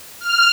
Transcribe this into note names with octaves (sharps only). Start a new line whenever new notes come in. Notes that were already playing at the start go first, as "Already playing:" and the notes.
F6